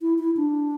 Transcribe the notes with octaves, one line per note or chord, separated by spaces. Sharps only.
E4
E4
D4